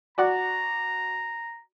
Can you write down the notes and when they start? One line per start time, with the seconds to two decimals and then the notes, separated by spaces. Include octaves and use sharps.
0.18 F#4 D5 F#5 A#5